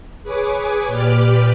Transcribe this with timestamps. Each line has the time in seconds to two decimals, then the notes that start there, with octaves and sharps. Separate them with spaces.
0.23 G#4 B4 C#5 G#5 D6
0.87 A#2 G4 B4 D5 D6 F6